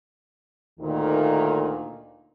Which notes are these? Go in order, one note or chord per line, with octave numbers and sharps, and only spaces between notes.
D2 A#2 D#3